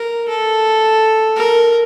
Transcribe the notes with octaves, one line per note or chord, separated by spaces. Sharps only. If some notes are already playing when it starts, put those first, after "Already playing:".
Already playing: A#4
A4
A#4